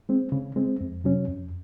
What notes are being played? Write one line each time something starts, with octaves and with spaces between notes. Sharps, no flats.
G#3 C4
C#3
G#3 C4
F2
C3 F#3 C#4
F2